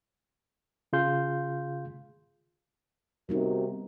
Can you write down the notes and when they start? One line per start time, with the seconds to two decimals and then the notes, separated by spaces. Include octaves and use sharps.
0.93 C#3 F4 G#4 F5 C6 G6
3.29 C3 G3 B3 D#4 F#4 A#4